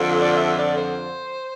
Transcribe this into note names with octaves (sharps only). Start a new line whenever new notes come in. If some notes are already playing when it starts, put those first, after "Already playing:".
Already playing: F2 D3 F3
D5
E5
D5
C5